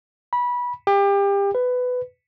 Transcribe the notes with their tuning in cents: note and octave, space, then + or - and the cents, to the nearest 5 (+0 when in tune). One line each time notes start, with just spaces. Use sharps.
B5 -20
G4 +30
B4 +15